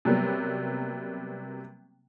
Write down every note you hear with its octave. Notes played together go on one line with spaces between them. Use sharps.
C3 F#3 G3 A#3 B3